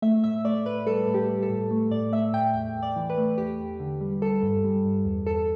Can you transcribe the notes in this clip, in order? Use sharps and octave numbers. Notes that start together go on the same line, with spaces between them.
A3 E5
A2 E5
A3 D5
A2 B4
G3 A4
A2
G4
G3
A4
A2
A3
A2 D5
A3 E5
A2 G5
E2 G5
E2
D5
E3
B4
A3
E2 G4
E2
D3
G3
G3 A4
G2
G3
G2
E2
E2 A4